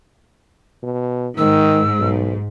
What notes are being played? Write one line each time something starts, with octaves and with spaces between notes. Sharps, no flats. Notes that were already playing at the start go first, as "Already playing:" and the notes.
B2
G#2 D#3 E6
B1